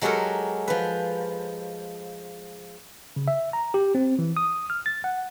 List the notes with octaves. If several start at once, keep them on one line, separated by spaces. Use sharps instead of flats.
F#3 G#3 F#4 G4 A4 A#4
F3 B4
C#3
E5
A#5
G4
C4
E3
D#6
F6
A6
F#5